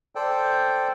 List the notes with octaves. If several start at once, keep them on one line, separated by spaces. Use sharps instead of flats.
A4 C5 D5 G5